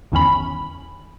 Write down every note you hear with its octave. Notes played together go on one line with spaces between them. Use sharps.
G1 E2 D#3 C#4 B5